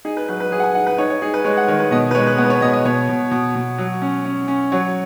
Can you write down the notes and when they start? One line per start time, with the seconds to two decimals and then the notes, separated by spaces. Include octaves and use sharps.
0.05 D#4 G#4
0.17 B4
0.29 F#3 B4
0.40 B4
0.52 F#3 G#4
0.60 F#5
0.63 G#5
0.75 D#4 F#5
0.87 B4
0.98 D#4 C#5
1.10 C#5
1.22 D#4 G#4
1.34 B4
1.45 G#3 C#5
1.57 F#5
1.68 D#3 C#5
1.80 B4
1.91 B2 D#5
2.11 B4
2.15 G#3 C#5
2.27 B4
2.38 B3 C#5
2.45 B4
2.50 C#5
2.61 B2 D#5
2.73 D#5
2.85 B2 C#5
3.09 B2
3.31 B2
3.55 B2
3.78 F#3
4.02 C#4
4.25 C#4
4.48 C#4
4.72 F#3 C#5